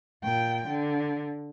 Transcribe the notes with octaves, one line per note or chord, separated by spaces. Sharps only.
A#2 G5
D3